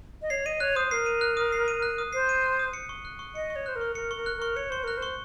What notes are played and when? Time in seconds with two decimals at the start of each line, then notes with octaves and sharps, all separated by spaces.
0.22 D#5
0.30 C#5 C7
0.46 D#5 D#7
0.60 C#5 F#6
0.76 C5 D#6
0.91 A#4 C7
1.06 D#7
1.21 F#6
1.37 D#6
1.52 C7
1.68 D#7
1.82 F#6
1.98 D#6
2.13 C5 C7
2.29 D#7
2.44 F#6
2.59 D#6
2.73 C#7
2.89 C#6
3.05 F#6
3.19 C#6
3.35 D#5 C#7
3.50 C#6
3.56 C#5
3.66 C5 F#6
3.76 A#4
3.81 C#6
3.95 A#4 C#7
4.11 C#6
4.16 A#4
4.26 F#6
4.37 A#4
4.42 C#6
4.56 C#5 C#7
4.70 C5 C#6
4.84 A#4 F#6
4.97 C5
5.02 C#6